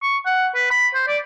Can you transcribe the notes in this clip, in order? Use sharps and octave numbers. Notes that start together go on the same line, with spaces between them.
C#6
F#5
B4
B5
C5
D5